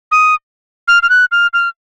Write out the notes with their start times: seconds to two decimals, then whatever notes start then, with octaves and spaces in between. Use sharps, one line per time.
0.12 D#6
0.88 F6
1.03 F6
1.10 F#6
1.32 F6
1.54 F6